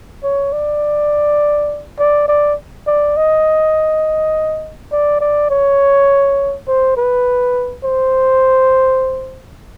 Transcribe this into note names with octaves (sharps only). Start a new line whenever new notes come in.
C#5
D5
D5
D5
D5
D#5
D5
D5
C#5
C5
B4
C5